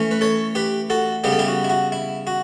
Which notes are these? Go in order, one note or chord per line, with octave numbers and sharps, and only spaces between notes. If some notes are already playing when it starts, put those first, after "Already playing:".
Already playing: E3 A3 C#4
B4
A4 C#5
G4 B4
F#4 A4
C#3 G3 B3 G4
A4
E4 G4
F#4
E4
F#4
E4
F#4